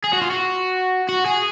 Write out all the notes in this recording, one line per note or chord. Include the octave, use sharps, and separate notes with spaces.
G#4
F#4
F4
F#4
F#4
G#4